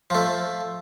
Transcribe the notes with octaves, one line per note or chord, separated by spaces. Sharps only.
F3 A3